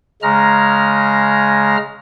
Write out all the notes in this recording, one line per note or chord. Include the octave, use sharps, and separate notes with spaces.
C#3 G#3 A#5 F6